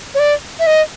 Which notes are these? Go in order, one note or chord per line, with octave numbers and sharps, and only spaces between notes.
C#5
D5
E5
D#5